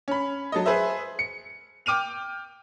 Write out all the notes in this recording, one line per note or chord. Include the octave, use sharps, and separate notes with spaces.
C#4 B5
F#3 A4 D#5
G#4 B4 C5 E5
C#7
G5 D6 F6 D#7 F7